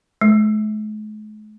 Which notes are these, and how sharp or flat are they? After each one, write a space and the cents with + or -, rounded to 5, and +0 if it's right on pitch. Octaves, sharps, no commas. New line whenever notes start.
G#3 +45